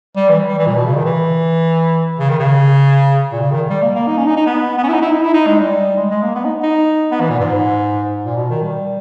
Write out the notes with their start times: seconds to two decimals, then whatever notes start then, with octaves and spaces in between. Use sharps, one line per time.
0.16 G3
0.29 E3
0.48 G3
0.58 E3
0.66 A#2
0.76 B2
0.86 C#3
0.96 D#3
1.05 E3
2.19 C#3
2.29 D#3
2.39 C#3
3.32 A#2
3.41 C#3
3.51 D#3
3.70 G3
3.82 A#3
3.95 A#3
4.07 D#4
4.17 C#4
4.26 D#4
4.37 D#4
4.46 B3
4.78 B3
4.83 C#4
4.88 E4
4.93 D#4
5.02 E4
5.12 D#4
5.22 E4
5.34 D#4
5.47 G#3
5.59 G3
5.97 G#3
6.10 G#3
6.22 A#3
6.35 B3
6.44 D#4
6.63 D#4
7.11 B3
7.20 E3
7.30 A#2
7.39 G#2
8.25 A#2
8.36 B2
8.49 D#3
8.62 G3